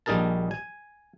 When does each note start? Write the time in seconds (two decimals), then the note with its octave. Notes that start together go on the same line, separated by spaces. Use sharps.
0.06 A#1 G3 D#4 G#4 A#4 A5
0.51 G#5